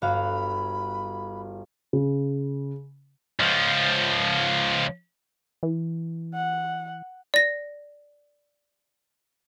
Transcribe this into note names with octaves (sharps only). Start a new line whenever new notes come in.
G1 F#4 F5 B5
C#3
C#2 F3
E3
F#5
D5 A#6